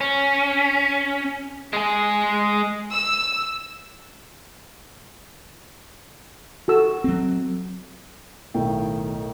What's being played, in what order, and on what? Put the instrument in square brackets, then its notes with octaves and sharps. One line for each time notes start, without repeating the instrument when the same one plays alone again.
[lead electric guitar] C#4
G#3 G#4
[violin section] E6
[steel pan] F#4 A4 E6
[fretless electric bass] F#3 C4
[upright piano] B1 A2 G5 [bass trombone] D#3